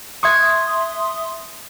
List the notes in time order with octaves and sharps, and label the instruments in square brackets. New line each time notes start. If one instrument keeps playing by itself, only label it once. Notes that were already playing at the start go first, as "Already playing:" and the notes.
[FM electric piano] E5 C6 D#6 [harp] C#6 F#6 G#6